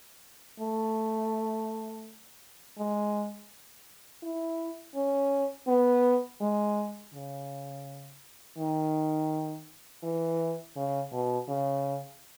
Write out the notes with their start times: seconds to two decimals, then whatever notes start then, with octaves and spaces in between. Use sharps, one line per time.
0.60 A3
2.78 G#3
4.22 E4
4.95 C#4
5.67 B3
6.41 G#3
7.14 C#3
8.58 D#3
10.03 E3
10.76 C#3
11.12 B2
11.48 C#3